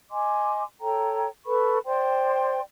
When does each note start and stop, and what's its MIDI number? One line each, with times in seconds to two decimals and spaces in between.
0.10 0.63 75
0.10 0.63 80
0.10 0.63 84
0.10 0.63 86
0.81 1.27 69
0.81 1.27 73
0.81 1.27 79
0.81 1.27 82
1.45 1.78 69
1.45 1.78 71
1.45 1.78 83
1.45 1.78 85
1.85 2.59 72
1.85 2.59 74
1.85 2.59 79
1.85 2.59 84